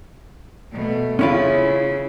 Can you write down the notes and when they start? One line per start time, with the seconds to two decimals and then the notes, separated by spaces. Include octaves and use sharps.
0.72 B2 A3
1.19 C#3 C#4 E4 F4